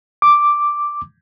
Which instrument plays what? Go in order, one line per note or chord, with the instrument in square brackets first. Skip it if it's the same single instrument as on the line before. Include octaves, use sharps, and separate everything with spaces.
[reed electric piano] D6